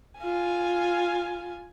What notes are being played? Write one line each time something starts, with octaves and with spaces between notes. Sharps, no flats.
F4 G#5